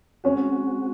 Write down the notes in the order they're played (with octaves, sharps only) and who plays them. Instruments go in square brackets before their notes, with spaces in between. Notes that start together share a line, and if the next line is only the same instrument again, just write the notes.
[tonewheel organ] G#3 C4 F#4 [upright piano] C#4